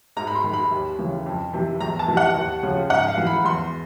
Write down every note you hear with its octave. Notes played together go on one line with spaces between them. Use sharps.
G#2 A#5
B5
C6
D#3
B5
D#2
C#3 E3
F2
C3 E3
E2 A#5
A5
C3 E3
F#5
D#2
C#3 F3
G#2 F#5
F5
E3
B5
E2 C6